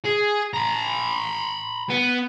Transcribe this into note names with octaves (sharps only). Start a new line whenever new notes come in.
G#4
A#5 B5
B3